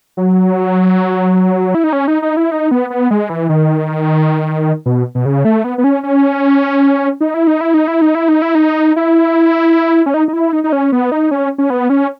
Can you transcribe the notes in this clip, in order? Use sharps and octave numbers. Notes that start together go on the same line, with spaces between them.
F#3
E4
D#4
C#4
D#4
D#4
E4
D#4
B3
B3
G#3
E3
D#3
B2
B2
C#3
A3
B3
B3
C#4
C#4
D#4
E4
D#4
E4
D#4
E4
D#4
E4
D#4
E4
D#4
E4
C#4
D#4
D#4
E4
D#4
D#4
C#4
B3
D#4
C#4
C#4
B3
C#4